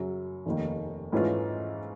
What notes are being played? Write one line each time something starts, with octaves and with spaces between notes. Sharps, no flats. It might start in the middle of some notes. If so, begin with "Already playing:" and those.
Already playing: F#2 C#3 F#3
F1 D#2 D#3
G#2 E3 A3 C#4 F4